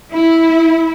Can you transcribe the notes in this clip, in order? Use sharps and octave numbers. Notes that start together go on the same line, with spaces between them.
E4